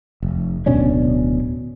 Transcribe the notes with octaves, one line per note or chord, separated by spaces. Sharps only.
F1
D1 B2 C#4 D4